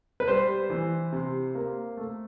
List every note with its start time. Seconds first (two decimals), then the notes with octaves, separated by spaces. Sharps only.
0.20 B4
0.28 G3 C5
0.70 E3
1.12 C3
1.55 A#3
1.97 A3